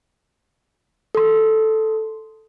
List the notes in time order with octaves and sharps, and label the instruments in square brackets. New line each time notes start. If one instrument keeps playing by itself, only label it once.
[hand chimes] A4 C6